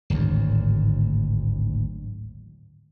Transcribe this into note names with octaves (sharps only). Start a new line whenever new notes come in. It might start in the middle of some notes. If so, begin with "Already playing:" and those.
D1 G#1 D2